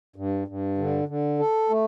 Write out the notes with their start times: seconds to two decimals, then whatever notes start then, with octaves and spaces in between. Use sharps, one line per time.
0.16 G2
0.48 G2
0.78 D3
1.08 D3
1.39 A4
1.69 A3